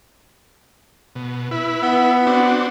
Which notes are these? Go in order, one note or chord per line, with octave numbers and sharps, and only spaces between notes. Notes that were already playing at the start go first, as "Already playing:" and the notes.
B2
E4 B4
B3
C4 D4 F#4